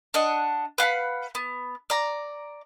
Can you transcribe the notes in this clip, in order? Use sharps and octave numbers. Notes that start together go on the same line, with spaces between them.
D4 D#5 F#5
B4 F5 F#5 B5
B3
D5 A#5